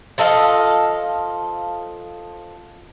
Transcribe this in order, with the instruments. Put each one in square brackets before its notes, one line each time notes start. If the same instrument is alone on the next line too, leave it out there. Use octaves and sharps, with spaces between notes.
[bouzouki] F3 A4 D#5 F5